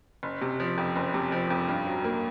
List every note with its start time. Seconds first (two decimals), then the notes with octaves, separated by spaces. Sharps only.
0.23 F#1
0.41 C3
0.60 F3
0.78 F2
0.96 F#1
1.14 C3
1.32 F3
1.50 F2
1.69 G2
1.87 F#3
2.04 A#3